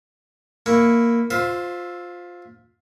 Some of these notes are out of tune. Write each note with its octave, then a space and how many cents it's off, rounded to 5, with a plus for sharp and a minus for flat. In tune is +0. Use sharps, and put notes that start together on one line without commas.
A#3 +0 E4 +0 C#6 +0
F4 +15 C5 -5 E5 +0